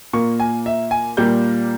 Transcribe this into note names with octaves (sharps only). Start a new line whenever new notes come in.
A#2 A#3 C#6
G#5
E5
G#5
A#2 G3 A#3 G6